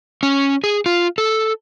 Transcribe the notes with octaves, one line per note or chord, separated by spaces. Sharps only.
C#4
G#4
F4
A4